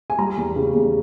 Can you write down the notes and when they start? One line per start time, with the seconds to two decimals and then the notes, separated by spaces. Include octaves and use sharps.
0.10 G#5
0.18 G3 A#5
0.37 E2
0.56 C#3
0.74 E2